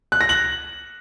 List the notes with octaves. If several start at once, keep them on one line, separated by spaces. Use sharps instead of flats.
F#6
A#6
F#7